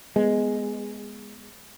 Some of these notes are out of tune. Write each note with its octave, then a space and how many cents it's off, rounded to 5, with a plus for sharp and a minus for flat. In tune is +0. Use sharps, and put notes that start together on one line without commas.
G#3 +0 B3 +0